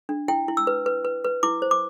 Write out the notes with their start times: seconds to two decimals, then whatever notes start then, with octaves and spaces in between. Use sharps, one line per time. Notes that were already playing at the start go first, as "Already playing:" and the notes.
0.09 D4
0.28 E4 G5
0.48 E4
0.57 E6
0.67 B4
0.86 B4
1.05 B4
1.24 B4
1.43 E4 D6
1.62 C5
1.71 D6